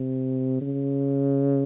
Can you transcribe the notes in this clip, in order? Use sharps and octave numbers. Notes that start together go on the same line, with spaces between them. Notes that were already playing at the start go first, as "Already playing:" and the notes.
Already playing: C3
C#3